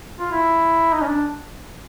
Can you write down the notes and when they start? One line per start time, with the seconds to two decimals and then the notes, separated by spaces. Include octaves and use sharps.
0.20 F4
0.32 E4
0.93 D#4
1.02 C#4
1.07 D4